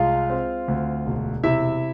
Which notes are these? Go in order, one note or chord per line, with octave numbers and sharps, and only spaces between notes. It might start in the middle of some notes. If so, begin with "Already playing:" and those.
Already playing: C2 G#3 F4 F5
C4
D2
E1
C3 E4 E5